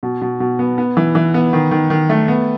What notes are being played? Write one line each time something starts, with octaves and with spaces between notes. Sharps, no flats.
B2
B2
B2
B3
B3
E3
E3
B3
D#3
D#3
D#3
A3
B3